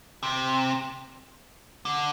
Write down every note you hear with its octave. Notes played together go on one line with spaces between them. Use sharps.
C3
D3